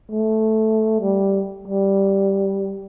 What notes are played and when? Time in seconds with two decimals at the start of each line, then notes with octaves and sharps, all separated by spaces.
0.11 A3
1.01 G3
1.68 G3